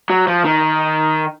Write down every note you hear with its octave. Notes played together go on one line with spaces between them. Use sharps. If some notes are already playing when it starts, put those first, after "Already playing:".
F#3
F3
D#3